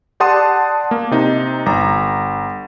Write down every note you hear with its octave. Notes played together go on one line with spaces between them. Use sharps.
G4 D5 F#5 A5 C6 D#6
A#3
C3 D#4
G1 A#5